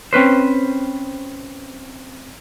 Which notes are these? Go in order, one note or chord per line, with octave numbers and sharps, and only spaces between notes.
C4 C#4 B4 C5